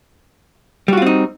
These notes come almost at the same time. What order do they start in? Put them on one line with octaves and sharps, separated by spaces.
G3 F#4 F4 C4 D#4